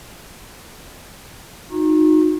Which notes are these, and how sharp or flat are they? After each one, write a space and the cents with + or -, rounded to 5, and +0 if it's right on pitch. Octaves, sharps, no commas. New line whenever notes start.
D#4 -5 F#4 -40